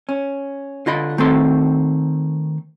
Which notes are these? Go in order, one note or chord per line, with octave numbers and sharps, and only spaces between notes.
C#4
D3 F4 D#5 B5
D#3 A3 C4 A4 C6